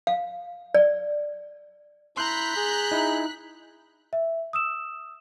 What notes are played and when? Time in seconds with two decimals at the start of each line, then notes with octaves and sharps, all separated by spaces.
0.07 F5
0.74 D5
2.17 E4 A#5 C6 F#6 G6 B6
2.56 G#4
2.92 D#4 E4
4.13 E5
4.53 D#6 E6 E7